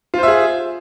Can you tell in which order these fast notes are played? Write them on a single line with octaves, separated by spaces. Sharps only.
F4 C5 E5 G#4